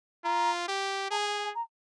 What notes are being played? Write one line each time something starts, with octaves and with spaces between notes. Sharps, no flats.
F4 A#5
G4
G#4 A5
G#5
G#5
G#5
A#5